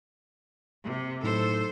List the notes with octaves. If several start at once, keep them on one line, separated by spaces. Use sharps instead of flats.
C3
A2 F#3 D#4 A4 C5